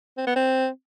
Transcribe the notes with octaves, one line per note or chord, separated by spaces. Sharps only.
C4
B3
C4